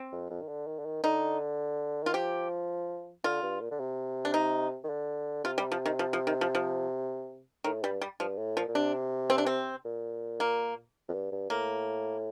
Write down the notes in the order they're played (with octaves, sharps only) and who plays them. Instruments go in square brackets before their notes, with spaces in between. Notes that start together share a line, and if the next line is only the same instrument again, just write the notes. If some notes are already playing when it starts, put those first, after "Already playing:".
Already playing: [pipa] C4
[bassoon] F2
F2
D#3
D3
D#3
D3
D#3
[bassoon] D3 [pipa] D#4
[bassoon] D#3 [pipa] F4
[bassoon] F3 [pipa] G4
[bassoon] D3 [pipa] F4
[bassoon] G2
A#2
D3
C3
[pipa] D4
D#4
[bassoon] D#3
D3
[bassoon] C3 [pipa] F4
[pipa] G3
F3
D#3
F3
F3
D#3
F3
F3
[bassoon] A2 [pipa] D#3
[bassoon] G2 [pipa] G3
[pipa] G3
[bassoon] G2 [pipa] F3
[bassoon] A2
[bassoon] A#2 [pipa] F3
[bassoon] A#2
[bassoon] C3 [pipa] D4
[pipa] C4
D4
C4
[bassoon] A#2
[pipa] A#3
[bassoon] F2
G2
G2
[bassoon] A2 [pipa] A#3